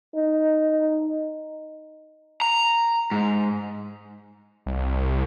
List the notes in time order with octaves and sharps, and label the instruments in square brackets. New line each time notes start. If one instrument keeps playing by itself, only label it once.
[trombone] D#4
[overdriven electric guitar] A#5
G#2
[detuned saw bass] C2